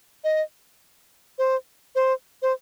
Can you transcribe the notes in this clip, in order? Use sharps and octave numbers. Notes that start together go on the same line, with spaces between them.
D#5
C5
C5
C5